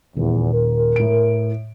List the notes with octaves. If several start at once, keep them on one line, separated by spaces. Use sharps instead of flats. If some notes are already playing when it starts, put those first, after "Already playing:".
D#1 E2
A#4
A2 D7